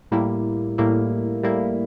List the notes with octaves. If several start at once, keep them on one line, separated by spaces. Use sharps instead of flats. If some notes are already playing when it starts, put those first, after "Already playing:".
A2 G3 A#3 E4
A2 G3 A#3 E4
A2 G3 A#3 E4